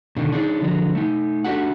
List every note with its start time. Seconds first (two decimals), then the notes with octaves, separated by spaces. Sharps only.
0.17 B2 D3 D#3
0.32 D4 D#4 G#4 A4 C#5
0.61 D3 F3 F#3
0.95 A3 D#4
1.45 A3 D4 F#4 G4 A4 F#5